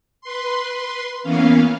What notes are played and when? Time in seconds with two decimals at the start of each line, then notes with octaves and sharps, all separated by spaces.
0.21 B4 C6
1.23 E3 A#3 B3 C#4 F5